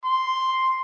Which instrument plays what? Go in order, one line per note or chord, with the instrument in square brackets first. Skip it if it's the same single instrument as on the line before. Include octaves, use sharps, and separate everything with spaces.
[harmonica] C6